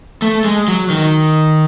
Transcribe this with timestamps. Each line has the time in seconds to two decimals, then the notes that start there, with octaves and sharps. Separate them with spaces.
0.22 A3
0.45 G#3
0.68 F#3
0.90 D#3